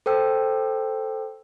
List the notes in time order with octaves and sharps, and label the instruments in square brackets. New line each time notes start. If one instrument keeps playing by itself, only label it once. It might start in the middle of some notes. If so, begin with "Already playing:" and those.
[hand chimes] A4 C5 G5 E6